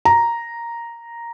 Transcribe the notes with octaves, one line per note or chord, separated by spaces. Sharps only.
A#5